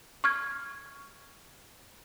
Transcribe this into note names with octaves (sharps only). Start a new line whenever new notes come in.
C#6 F6 G#6